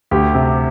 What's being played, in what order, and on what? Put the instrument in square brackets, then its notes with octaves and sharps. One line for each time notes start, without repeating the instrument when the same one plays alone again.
[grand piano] D2 G4
C3